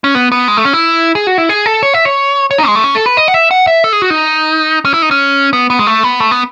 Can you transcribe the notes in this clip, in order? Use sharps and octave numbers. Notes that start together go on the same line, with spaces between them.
C#4
B3
B3
G#3
A3
C#4
E4
G#4
F#4
E4
G#4
A4
C#5
E5
C#5
C#5
D#4
G#3
A3
C#4
A4
B4
D#5
F#5
E5
F#5
E5
A4
G#4
F#4
D#4
C#4
E4
D#4
C#4
B3
B3
G#3
A3
B3
A3
B3